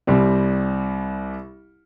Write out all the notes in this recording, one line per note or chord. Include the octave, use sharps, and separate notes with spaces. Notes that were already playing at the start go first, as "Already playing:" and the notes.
C2 G3 C4